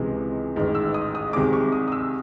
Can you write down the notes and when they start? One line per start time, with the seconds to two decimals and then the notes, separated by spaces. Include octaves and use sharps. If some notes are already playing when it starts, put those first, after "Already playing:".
Already playing: C#2 C3 E3 G#3
0.56 A1 G#2 D#3
0.75 E6
0.94 D#6
1.15 D#6
1.33 C2 C3 D#3 G#3 D6
1.53 C#6
1.72 D#6
1.88 D#6
1.92 E6